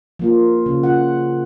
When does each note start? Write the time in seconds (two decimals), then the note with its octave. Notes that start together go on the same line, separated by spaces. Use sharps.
0.19 F3 A#3 F4
0.66 C#3
0.83 F4 F#5